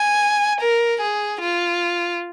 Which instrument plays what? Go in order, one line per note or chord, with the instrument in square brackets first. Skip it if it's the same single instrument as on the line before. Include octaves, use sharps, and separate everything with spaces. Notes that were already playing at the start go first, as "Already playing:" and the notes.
Already playing: [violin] G#5
A#4
G#4
F4